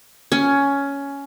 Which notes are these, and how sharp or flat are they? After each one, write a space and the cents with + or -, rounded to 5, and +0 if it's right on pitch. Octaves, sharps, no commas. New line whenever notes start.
C#4 +10